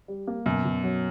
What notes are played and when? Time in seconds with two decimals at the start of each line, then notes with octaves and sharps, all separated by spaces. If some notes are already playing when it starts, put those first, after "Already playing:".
0.08 G3
0.28 A#3
0.46 F#2 B2
0.65 B2
0.83 F#3